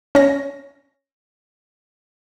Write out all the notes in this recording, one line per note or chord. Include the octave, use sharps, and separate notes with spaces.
C#4 A#6